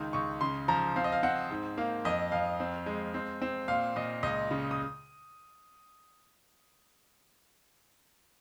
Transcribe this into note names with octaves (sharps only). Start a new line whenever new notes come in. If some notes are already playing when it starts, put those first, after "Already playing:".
Already playing: C#2 D#3
C#2 C#6
C#3 C6
F3 A#5
C4 F5
D#5
F5
C4 F#5
G#2
A#3 F5
F2 D#5
F2 F5
C4
G#3
C4
C4
A#2 F5
A#2 D#5
C#2 D#5
C#3
D#6